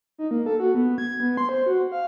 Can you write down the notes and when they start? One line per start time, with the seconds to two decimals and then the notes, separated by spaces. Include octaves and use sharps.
0.18 D#4
0.31 A#3
0.46 A4
0.60 F#4
0.75 B3
0.98 G#6
1.20 B3
1.37 C6
1.49 C5
1.66 F#4
1.92 F5